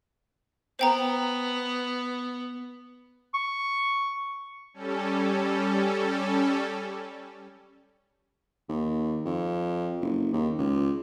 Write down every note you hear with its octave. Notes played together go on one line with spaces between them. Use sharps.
B3 C5 G5 A#5
C#6
G3 C#4 A4
D#2
F2
F#1
D#2
C#2